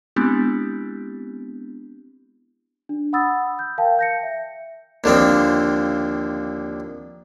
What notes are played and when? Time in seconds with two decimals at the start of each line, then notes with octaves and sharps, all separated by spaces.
0.16 G#3 B3 C4 D4 E4 G4
2.89 D4
3.13 F#5 B5 D#6 E6 A6
3.59 G6
3.78 A#4 F5 G5 A5
3.99 G6 A#6 C#7
4.23 E5
5.04 D#2 D3 F3 C4